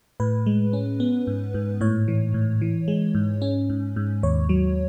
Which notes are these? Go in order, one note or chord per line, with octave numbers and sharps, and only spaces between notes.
A2 B4
G#3
C#4
B3
G#2
G#2
A2 C#5
E3
A2
E3
G#3
G#2
C#4
G#2
G#2
D#2 C#5
F#3